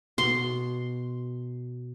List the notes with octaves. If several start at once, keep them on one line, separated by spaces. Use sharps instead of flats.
B2 C6